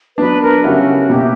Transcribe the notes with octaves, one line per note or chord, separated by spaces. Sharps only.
F#3 B3 D4 B4
A#4
C#3 G3 C#4 E4 F#4
B2 A#3 E4 G4